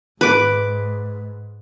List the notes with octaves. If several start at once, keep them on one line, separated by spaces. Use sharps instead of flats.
G#2 B4 D6